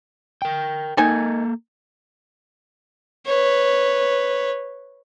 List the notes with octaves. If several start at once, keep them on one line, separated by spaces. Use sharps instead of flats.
A#4 G5
D#3 A#3 D#4 A4 G#5
B4 C#5